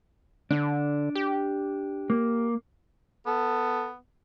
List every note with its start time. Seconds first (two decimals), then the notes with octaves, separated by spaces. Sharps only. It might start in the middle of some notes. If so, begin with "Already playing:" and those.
0.51 D3 D4
1.15 G4
2.10 A#3
3.26 B3 A4